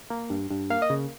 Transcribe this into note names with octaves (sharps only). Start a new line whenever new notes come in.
A#3
G2
G2
A#3 F5
D#5
C#3